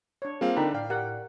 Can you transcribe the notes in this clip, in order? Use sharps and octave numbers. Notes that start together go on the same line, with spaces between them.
D4 C#5
G3 A#3 C4 F4 G#4 F5
D3 C4 D4 D#4 A#4 G5 B5
A2 D5 F5 G5
G4 A#4 F#5